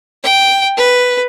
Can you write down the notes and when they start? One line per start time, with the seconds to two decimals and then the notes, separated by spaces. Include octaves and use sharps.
0.24 G5
0.78 B4